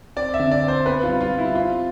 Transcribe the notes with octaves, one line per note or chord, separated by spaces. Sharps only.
C4 D5
E5
D3
D5
C4
C5
B3 B4
F4
G3
F4
G3
E4
C4 F4